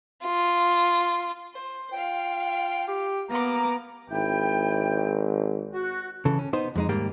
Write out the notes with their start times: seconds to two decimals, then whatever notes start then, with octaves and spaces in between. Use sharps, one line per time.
0.25 F4
1.54 C5
1.93 F4 F5 G5
2.88 G4
3.29 A#3 B3 A#5 D6
4.10 G#1 E4 G5
5.72 F#4
6.25 C#3 E3 A4
6.39 C#4
6.53 B3 D#4 C5
6.76 F2 G#3 D#4
6.89 D#2 G#2 G3 A#3 G4